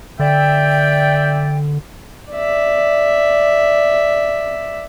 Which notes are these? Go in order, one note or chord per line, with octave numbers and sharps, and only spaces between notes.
D3 D5 E5 G5
D5 E5